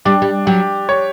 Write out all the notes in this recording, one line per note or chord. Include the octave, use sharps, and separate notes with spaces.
G3 D4
G3
F#3 G4
C#5